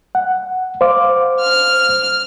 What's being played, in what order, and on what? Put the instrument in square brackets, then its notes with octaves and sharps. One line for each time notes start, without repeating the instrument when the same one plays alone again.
[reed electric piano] F#5
C5 F5 D6
[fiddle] F6